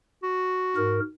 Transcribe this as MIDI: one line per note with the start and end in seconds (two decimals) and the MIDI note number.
0.23 1.06 66
0.76 1.00 44
0.76 1.00 70